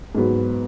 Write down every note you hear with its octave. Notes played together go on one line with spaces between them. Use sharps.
G#2 F#3 B3 F#4